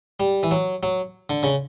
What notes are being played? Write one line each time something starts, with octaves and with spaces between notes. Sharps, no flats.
G3
E3
F#3
F#3
D3
C#3